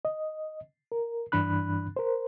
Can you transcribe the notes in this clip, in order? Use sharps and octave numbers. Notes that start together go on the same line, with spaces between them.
D#5
A#4
G2 E3 D4 B5 F#6
A#4 C5